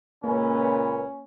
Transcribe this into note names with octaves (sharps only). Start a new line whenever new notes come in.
C#2 A#2 A#3 C#4 B4